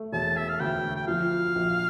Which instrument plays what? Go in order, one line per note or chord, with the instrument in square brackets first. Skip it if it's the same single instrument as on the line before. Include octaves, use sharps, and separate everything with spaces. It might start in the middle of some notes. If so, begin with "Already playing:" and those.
Already playing: [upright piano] A3
[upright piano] E1 [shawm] A5
[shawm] E5
F5
[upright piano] D2 [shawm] G5
[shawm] G5
[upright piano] F3 [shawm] F5
[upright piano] A#1